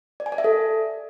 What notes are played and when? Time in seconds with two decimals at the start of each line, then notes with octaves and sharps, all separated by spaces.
0.20 D5
0.26 G#5
0.32 D5
0.38 E5
0.44 A4